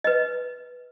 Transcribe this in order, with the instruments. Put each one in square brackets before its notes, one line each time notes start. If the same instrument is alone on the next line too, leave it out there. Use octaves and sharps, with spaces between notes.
[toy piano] B4 D#5